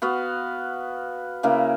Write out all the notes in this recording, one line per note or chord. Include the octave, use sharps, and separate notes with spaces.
B3 F#4 F5
C#3 A#3 E4